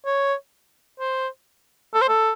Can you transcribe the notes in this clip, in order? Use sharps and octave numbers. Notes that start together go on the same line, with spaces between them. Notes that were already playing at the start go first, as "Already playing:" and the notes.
C#5
C5
A4
C5
A4